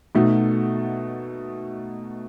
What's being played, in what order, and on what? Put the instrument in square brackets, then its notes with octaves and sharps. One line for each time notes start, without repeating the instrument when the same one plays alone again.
[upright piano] B2 A3 D#4 F#4